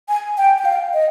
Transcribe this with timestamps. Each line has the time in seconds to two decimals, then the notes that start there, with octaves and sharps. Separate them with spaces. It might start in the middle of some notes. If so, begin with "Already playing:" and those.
0.09 G#5
0.38 G5
0.58 G5
0.65 F5
0.94 D#5